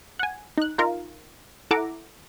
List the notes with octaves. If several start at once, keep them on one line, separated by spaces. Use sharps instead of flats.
F#5 G#5
D#4 F#6
D#4 F4 A#4
E4 A4 E5 F#5 A#5 D6